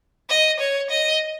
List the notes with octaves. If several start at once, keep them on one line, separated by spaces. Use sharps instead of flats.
D#5
C#5
D#5